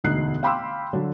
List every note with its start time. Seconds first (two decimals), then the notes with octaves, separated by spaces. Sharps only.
0.04 E1 D2 D#4 F#6 C7
0.43 F5 G5 B5 C6 D6 E6
0.93 D3 F#3 D4